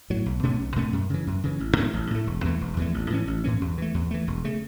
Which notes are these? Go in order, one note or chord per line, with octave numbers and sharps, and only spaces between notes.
A2 F#3
B1
B2 A3 C#4
B1
B2 A3 C#4
F#2
C#3 E3
F#2
C#3 E3
A1
A2 A3
A1
A2 A3
E1
E2 E3 A3
E1
E2 E3 A3
A1
A2 E3 C#4
A1
A2 E3 C#4
E2
E3 A3
E2
E3 A3
E1
C#3 A3